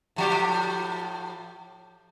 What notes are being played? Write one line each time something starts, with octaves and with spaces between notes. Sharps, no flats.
A2 F3 G4